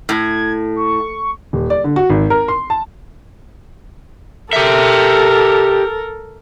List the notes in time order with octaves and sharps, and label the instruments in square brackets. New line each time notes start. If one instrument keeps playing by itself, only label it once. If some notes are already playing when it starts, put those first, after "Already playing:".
[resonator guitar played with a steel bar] A2 [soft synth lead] G#6
[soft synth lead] C#6
[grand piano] D#1
D5
D3
F#4
G#1
A#4
C6
A5
[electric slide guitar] G4 E5 [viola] A4 A#4